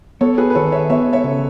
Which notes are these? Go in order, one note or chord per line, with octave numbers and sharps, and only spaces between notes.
B3 A4 C#5
G#4 B4
B4
D#3 A4 C#5
C#5 E5
B3 C#5 E5
C#5 E5
C#3